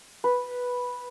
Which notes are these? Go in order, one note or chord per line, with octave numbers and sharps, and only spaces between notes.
B4